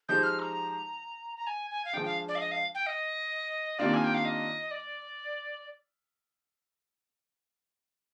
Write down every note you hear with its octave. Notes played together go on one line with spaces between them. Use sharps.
F3 G#3 D#4 G4 C5 G6
F6
A#5
A#5
G#5
G#5
F5
F3 G#3 D4 G5
F5
D5
F5
D#5
F5
G5
D#5
C3 D#3 A#3 D4 F4 D5
G#5
G5
F5
D#5
D5